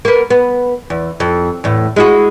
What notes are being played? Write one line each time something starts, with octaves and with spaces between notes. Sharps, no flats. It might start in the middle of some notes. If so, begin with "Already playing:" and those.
A#3 B3
B3
E2
F2
E2 A2
G#3 E4 F#4